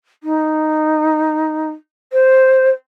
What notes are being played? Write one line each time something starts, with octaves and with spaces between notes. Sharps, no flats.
D#4
C5